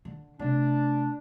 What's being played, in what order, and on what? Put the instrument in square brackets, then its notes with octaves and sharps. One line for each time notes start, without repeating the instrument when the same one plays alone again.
[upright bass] D3
[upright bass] C3 A3 [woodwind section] D4